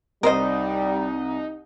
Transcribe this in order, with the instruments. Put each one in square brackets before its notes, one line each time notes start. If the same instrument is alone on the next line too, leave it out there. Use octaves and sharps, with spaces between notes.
[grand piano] C2 D#6 [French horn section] G3 [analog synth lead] D#4 [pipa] A#4 C5 D#5